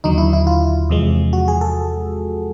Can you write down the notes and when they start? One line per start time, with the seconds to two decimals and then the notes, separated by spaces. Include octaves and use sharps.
0.04 D#2 D3 F#3 D#4
0.18 E4
0.33 E4
0.47 F4
0.89 E2 C3 F3 G#3
1.33 F#4
1.48 G#4
1.61 A4